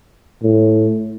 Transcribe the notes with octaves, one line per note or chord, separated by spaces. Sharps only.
A2